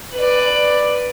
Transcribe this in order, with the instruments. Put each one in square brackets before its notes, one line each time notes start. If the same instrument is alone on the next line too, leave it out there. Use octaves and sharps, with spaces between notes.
[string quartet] B4 D5